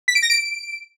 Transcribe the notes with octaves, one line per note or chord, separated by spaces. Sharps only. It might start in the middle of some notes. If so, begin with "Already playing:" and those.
B6
D7
A#6
D7